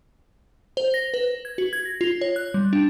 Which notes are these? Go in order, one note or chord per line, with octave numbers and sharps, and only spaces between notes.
C5
A#6
B4
G#6
F#4
G#6
A#6
F4
C#5
F#6
G3
D4